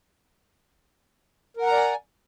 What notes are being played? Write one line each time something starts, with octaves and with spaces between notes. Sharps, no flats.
A#4 D5 F#5 G#5 A#5